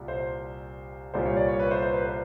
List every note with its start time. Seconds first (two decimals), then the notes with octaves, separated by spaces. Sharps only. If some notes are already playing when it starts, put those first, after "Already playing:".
Already playing: C2 A#2 G3
0.08 C5
1.14 C2 A#2 G3 C5
1.25 C#5
1.37 D5
1.48 C#5
1.59 B4
1.71 C5
1.82 C5
1.94 B4
2.05 C5